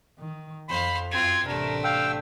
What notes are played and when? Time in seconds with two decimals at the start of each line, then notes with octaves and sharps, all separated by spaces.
0.19 D#3
0.69 F2 C5 F5 B5
1.11 F#2 C4 F4 G#6
1.47 A1 C3 A3 D4 A#4
1.84 F5 G5 E6